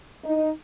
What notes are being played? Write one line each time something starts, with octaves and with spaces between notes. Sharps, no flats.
D#4